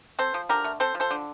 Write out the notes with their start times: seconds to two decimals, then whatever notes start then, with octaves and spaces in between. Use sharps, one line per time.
0.19 C4 A4 C5
0.34 F3
0.49 D3 G4 A#4
0.64 A3
0.80 C4 A4 C5
0.95 F3
1.00 A4 C5
1.11 D3